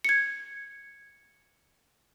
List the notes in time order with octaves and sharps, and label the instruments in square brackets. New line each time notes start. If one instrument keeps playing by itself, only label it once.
[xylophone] G#6 C#7